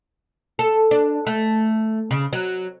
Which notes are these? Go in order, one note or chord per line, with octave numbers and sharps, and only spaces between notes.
A4
D4
A3
C#3
F#3